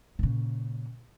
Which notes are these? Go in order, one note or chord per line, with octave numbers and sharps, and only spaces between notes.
A#2 C#3